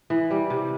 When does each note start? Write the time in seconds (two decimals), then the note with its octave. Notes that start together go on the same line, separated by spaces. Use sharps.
0.10 E3
0.31 G3
0.50 C3